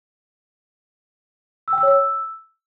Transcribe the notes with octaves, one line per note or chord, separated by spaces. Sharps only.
E6
G5
E6
C#5
E6